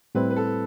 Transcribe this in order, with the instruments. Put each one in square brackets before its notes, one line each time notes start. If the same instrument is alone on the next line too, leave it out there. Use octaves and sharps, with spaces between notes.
[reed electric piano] A2 G3 C4 E4 [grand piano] B4
[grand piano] B4
A4